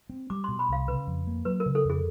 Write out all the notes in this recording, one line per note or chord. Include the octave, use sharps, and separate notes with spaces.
C4
G3 D6
B2 C6
B5
C2 F5
C#3 B4
F2
A#3
F#3 B4
A#4
C#3
A4
F2 G#4